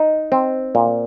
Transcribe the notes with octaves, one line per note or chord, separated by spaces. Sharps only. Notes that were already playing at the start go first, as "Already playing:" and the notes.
Already playing: D#4
C4
A#2